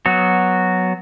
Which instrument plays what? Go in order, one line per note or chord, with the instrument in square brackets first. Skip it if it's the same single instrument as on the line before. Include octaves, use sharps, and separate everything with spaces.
[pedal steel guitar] F#3 B3 F#4